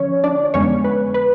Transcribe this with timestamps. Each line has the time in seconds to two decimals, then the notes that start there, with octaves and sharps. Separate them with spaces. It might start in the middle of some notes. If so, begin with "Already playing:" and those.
Already playing: D3 F3 C#4 C#5
0.24 D4 D5
0.54 F2 D3 G#3 B3 C#4 C#5
0.84 B4
1.14 B4